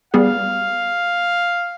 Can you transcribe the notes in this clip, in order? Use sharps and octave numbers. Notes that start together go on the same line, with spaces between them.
G3 B3 G#4 F5